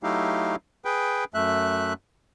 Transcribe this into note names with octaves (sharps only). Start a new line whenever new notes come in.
F#3 A3 D#4 E4 G4 F5
G#4 B4 G5
F#2 A3 E5 F#6